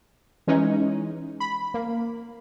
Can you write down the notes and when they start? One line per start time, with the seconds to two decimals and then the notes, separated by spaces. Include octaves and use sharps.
0.47 E3 G#3 C#4 D#4
1.40 B5
1.74 A#3